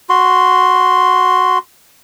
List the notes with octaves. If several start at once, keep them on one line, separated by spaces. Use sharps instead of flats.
F#4 C6